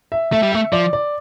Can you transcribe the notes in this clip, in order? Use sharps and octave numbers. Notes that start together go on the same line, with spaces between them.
E5
A3 E5
G3
A3 E5
F3 D5
D5